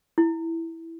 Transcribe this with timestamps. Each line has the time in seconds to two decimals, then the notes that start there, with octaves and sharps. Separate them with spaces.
0.18 E4